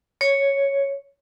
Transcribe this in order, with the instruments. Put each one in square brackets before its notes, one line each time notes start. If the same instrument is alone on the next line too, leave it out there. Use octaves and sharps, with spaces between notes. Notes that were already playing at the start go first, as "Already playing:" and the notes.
[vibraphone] C#5